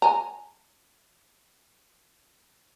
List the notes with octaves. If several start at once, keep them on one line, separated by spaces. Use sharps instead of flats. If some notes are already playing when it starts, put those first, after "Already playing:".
G#5 A#5